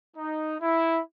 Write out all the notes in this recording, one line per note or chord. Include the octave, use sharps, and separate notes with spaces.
D#4
E4